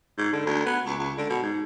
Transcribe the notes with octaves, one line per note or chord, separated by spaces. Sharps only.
G#2
D3
D2
B3
C#2
C#2
D3
B2
G#2